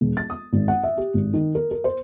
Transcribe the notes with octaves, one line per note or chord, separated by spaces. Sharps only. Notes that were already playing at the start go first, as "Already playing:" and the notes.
E1
A6
D#6
G#1
F#5
E5
G4
G#1
D#3
A#4
A#4
C5